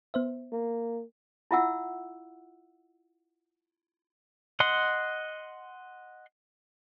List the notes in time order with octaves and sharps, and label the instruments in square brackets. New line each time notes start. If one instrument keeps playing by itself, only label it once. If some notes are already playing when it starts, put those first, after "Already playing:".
[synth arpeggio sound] B3 C5 E5
[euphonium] A#3
[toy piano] E4 F4 E5 F#5 E6
[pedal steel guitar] D#5 F#5 C6